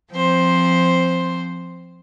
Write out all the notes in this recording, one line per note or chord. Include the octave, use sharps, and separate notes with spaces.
F3 C4 C5